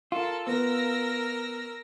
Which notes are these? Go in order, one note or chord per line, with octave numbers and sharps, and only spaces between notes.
F4 A4 A#4 A5
B3 A#4 E6 A#6